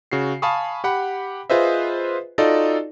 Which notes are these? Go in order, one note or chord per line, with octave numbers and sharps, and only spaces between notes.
C#3 F#4 C7
F5 G#5 A5 B5 C#6 D#6
G4 F#5 B5
F4 G#4 B4 C5 D#5 E5
D#4 F4 F#4 A4 D5 D#5